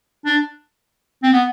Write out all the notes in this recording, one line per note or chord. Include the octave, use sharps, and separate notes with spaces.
D4
C4
B3